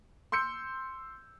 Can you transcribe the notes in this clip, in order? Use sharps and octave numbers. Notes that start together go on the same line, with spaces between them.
C6 E6 G6 C#7